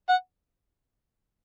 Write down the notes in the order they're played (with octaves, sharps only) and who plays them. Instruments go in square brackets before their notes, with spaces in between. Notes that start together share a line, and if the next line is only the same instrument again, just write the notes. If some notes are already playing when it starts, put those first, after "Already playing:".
[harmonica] F#5